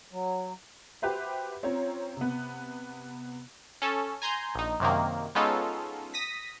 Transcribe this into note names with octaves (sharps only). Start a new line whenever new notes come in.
F#3
F#4 G4 B4 C5 E5
C4 C#4 F4 C#5 A#5
C3 B3
C#4 A4
G#5 A#5 C6 G6
A#1 D#4
F#2 C3 D#3 A#3
G#3 B3 C#4 D#4 F4 A4
D#6 A#6 B6